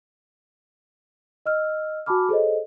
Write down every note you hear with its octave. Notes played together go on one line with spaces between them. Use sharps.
D#5 E6 F6
F#4 G#5 A5 B5 D6 F6
G#4 A4 C5 C#5 D#5